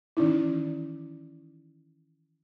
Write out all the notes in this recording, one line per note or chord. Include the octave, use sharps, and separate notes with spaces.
D#3 E3 C#4 D#4 E4